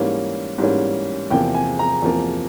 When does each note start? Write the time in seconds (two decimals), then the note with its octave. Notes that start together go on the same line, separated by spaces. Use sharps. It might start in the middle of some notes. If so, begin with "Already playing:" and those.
Already playing: G#2 E3 G3 A#3 C#4
0.58 G#2 E3 G3 A#3 C#4
1.31 E2 C3 F3 A#3 G5
1.55 G#5
1.79 A#5
2.02 E2 C3 F3 A#3